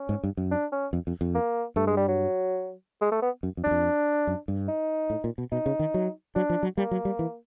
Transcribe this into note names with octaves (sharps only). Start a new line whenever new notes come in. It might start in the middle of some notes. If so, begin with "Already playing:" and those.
Already playing: C#4
G#2
G2
F#2
D4
C#4
F2
F2
F2
A#3
G2 A3
G#3
G3
F#3
G#3
A3
B3
F#2
F2
F#2 D4
F2
F#2
G2
D#4
A2
A#2
B2
B2 D#4
C#3
D#3
F#3
F#3 D4
F3
F#3
G3 A#3
F#3
G3
E3